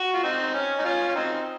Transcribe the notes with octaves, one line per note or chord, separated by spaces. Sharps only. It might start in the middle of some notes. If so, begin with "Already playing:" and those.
Already playing: F#4
F4
C4 D#4
C#4
D#4
C#4 F4
C#4
C4 D#4